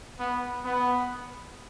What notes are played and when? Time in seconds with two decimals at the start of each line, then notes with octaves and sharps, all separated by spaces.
0.19 B3
0.64 B3